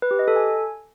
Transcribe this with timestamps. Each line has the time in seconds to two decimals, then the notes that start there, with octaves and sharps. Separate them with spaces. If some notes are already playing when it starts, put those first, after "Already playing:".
0.02 B4
0.11 G4
0.19 D#5
0.28 A4
0.36 G#5